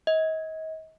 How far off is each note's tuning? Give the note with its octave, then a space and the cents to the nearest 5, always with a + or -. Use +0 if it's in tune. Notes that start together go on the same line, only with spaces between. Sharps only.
D#5 +35